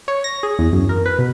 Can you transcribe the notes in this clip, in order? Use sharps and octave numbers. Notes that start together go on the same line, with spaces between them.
C#5
A#6
G#4
E2
F#2
A#4
B4
B2